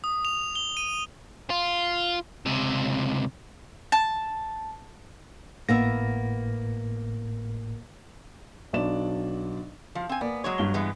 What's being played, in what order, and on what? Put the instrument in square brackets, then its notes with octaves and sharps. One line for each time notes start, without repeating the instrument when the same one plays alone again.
[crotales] D#6
F7
G7
D#7
[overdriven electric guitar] F4
C#2 C3
[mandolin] A5
[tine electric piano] G#1 A2 A#6 [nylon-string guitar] A#3 B3 E5
[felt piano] B1 F#3 D4 D5 E7
[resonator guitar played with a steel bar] F3 [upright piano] F5
[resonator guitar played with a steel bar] C4 G#5
[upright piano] A#3 D5 G#5 [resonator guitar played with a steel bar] B3
[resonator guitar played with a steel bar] F#3 G#3 C#5
[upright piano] G2 G7
[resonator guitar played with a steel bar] E3 G#3 B3